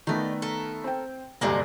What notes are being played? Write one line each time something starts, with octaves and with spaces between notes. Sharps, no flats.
D#3 A3 B3 D#4 D5
A4 A#4
C4 G5
F1 D2 G2 G3 G#3 A#3